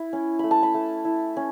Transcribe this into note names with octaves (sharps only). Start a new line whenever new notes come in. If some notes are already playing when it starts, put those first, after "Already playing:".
Already playing: E4
C#4
A3 B5
A5
B5
A3
E4
C#4